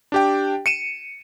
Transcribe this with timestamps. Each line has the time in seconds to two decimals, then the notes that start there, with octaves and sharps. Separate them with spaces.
0.12 D4 G4 G5
0.66 C#7 D#7 E7